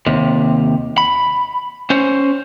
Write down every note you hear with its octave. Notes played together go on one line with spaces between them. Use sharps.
D#2 C3
B5
C#4 C5